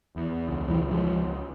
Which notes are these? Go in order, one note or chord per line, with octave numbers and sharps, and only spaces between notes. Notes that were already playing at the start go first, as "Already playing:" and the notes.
E2
C#2
E3 G3
C#2
F3 G#3
C#2